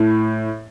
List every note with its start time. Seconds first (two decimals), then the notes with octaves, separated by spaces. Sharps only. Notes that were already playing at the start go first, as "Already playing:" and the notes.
Already playing: A2